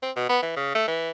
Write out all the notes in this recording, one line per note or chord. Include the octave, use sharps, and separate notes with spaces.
C4
B2
B3
E3
C#3
A3
E3